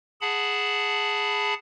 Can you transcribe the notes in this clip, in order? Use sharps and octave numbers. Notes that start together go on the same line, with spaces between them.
G#4 F#5 A5 B5